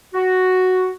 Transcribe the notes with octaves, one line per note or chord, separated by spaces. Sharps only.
F#4